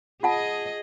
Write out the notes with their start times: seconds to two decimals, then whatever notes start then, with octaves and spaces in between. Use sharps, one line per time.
0.23 F4 G#4 D#5 F#5 A5